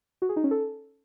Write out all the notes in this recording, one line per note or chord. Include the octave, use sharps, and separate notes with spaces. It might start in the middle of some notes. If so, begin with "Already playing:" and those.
F#4
G#4
D#4
C#4
A4